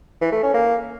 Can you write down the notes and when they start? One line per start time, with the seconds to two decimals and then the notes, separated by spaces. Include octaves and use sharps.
0.21 E3
0.32 A3
0.43 C#4
0.54 A#3